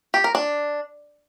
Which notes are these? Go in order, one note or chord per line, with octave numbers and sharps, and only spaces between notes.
G4
A#4
D4